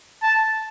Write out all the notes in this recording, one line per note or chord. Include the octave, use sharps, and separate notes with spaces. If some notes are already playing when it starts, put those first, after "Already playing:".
A5